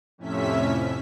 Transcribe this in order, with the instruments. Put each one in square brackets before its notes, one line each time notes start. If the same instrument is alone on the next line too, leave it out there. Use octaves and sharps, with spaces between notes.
[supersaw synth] F2 A2 C3 C#4 E5 B6